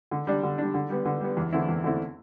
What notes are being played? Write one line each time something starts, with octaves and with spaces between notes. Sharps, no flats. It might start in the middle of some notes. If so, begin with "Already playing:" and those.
D3
G3 D4
D3
G3 D4
D3
G3 B3
D3
G3 B3
E2
D3 A3 C4 E4
E2
D3 A3 C4 E4